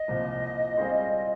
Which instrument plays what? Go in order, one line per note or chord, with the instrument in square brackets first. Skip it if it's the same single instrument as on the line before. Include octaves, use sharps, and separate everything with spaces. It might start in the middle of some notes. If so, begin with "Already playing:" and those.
Already playing: [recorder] D#5
[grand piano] C2 A#2 F3
G3 C4 F4 G#4 C5